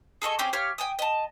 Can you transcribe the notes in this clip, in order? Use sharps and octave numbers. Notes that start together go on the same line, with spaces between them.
G#4 A4 D#5 C#6
C4 C#4 G4 G#4
G4 C#5 F5 F6
G5 G#5 D#6
D#5 A5